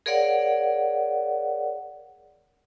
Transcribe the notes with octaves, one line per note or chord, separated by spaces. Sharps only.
G#4 A#4 C#5 D5 F5 F#5